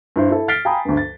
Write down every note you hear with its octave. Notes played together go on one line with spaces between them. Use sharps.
G2 E4 C5
E4 A4
F6 A6 B6 C7 D7 G7
F5 G5 G#5 A#5 B5 D#6
D2 G2
A6